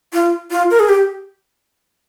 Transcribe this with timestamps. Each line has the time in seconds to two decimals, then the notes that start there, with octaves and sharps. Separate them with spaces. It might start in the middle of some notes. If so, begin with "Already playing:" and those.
0.13 F4
0.51 F4
0.71 A#4
0.80 G#4
0.89 G4